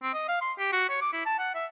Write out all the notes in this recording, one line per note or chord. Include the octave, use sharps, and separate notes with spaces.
C4
D#5
F5
C6
G4
F#4
C#5
D6
E4
A5
F#5
E5